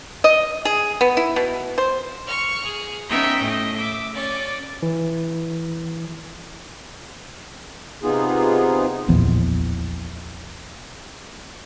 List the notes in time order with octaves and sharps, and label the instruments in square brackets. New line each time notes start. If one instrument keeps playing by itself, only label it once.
[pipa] D#5
G#4
B3
E4
B2
C5
[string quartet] C#6 F6
G#4
B3 C#4 D#4 E5 G5
A2 D#5
E5 D6
C#4 D5
[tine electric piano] E3
[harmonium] C3 B3 D#4 F4 G#4
[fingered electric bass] D1 A#1 E2